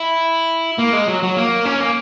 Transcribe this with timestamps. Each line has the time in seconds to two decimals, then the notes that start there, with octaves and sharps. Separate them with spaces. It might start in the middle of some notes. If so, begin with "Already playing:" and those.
Already playing: E4
0.79 A#3
0.94 G#3
1.08 F#3
1.23 F#3
1.37 A#3
1.66 C#4
1.81 A#3